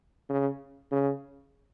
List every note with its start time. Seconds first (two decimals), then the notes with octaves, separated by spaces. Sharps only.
0.29 C#3
0.92 C#3